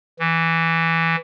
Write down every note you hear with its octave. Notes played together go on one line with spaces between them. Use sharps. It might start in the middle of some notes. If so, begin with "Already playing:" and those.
E3